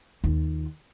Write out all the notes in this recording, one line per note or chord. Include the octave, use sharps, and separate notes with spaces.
D#2 F4